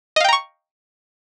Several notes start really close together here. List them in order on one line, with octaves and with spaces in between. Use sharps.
D#5 F5 G5 A#5 C#6